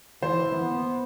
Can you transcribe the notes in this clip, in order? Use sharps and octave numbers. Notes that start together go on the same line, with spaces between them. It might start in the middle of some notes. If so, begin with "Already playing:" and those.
E3 C5
B3